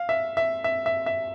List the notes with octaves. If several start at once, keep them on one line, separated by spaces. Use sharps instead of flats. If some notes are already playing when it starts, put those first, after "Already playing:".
Already playing: F5
E5
E5
E5
E5
E5